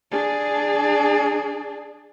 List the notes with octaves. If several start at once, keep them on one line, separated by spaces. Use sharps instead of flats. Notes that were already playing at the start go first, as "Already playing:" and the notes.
D4 G#4